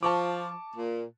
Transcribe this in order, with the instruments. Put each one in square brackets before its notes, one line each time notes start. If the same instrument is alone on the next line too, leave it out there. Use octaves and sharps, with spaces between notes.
[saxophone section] F3 [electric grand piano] A5 C#6 D6
[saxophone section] A#2